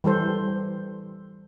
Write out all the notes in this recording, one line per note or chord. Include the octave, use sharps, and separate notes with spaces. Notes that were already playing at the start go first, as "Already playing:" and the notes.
E3 G3 A4 C5